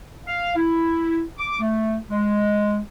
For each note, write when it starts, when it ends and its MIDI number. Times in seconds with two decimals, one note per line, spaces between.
0.27 0.55 77
0.56 1.22 64
1.38 1.60 86
1.60 1.96 57
2.10 2.79 56